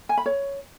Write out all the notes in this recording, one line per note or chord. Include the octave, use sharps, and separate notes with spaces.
G#5
B5
C#5